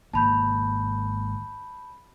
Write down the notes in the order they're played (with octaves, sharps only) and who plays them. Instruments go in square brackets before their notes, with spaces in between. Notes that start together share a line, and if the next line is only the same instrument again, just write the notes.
[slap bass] G#1 A#3 [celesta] A5 B5 G6